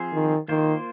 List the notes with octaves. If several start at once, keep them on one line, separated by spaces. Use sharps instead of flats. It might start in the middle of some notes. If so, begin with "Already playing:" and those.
Already playing: F3 C4 F4 G#4 C5
D#3
D#3 A#3 F4 C5